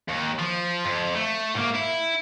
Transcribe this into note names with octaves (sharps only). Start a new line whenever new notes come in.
D#2
F3
F2
A3
G#2 A#3
E4